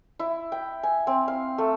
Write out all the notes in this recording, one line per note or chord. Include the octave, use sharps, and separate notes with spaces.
E4
G5
G#5
C4
F5
A3